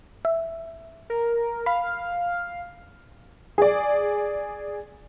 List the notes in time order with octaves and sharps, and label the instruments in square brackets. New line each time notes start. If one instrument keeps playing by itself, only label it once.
[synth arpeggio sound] E5
[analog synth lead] A#4
[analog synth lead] F5 [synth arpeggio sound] B5
[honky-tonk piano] G#4 D5